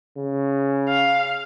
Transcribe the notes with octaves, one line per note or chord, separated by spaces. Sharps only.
C#3
F5